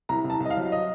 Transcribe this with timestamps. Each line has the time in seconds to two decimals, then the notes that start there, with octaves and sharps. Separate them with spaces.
0.09 C2 A#5
0.24 C2
0.30 A5
0.40 C2
0.45 D#5
0.50 F5
0.57 F#3
0.72 D#5